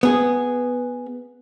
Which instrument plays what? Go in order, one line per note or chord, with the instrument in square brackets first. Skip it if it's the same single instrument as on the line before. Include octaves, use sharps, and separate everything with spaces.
[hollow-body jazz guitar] B3 G#4